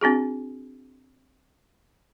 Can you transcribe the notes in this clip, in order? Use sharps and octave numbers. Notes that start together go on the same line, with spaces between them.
C4 D4 F#4 G#4